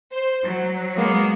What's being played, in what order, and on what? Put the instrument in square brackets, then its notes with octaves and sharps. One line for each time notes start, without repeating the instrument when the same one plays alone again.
[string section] C5
F#3
[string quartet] G#3 A#3 B3